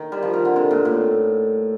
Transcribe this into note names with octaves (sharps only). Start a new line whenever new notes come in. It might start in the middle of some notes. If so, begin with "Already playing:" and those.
Already playing: D#3
G3
F3
D#3
D3
C3
A#2
A2